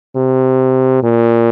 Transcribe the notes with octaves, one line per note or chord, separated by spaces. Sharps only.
C3
A#2